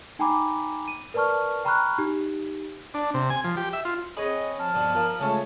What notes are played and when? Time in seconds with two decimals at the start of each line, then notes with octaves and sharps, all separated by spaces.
0.19 D#4 G5 G#5 A#5 B5 D6
0.88 D#7
1.14 A#4 B4 D5 A5 C#6 F6
1.65 G5 A#5 B5 C#6 F6 F#6
1.98 D#4 G4
2.94 D4
3.14 C3
3.30 G#5
3.44 F3
3.57 G4
3.73 E5
3.85 F4
4.17 C4 G#4 B4 C#5 D#5
4.59 F3 A5 F6
4.74 G2 B2
4.95 F3 A#4
5.20 C#2 A3 C#4 C#5 A5